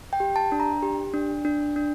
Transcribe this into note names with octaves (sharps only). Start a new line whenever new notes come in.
G5
G4
A5
D4
A#5
G4
D4
D4
D4